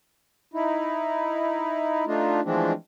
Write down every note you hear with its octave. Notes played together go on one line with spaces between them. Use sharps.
D#4 E4
A3 D4 D#4 F4
E3 F3 G#3 A3 C4 D4